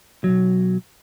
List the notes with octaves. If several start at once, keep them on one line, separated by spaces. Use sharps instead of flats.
B1 E2 F#3